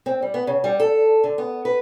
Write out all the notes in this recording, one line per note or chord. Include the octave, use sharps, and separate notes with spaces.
C4
G3
B3
C#3
G3
A4
D3
B3
B4